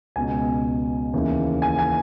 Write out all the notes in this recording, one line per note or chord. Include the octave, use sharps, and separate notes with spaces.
C#2 B2 G#5
D#2 C#3 E3
G#5
G#5